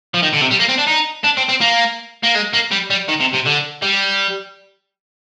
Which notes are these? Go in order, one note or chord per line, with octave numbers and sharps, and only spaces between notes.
F3
D#3
D3
C3
G3
A#3
C4
D4
D#4
D4
C4
C4
A#3
A#3
G#3
A#3
G3
G3
D#3
C3
C3
D3
G3